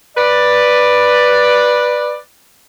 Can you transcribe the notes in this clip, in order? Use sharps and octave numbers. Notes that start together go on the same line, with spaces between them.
B4 D5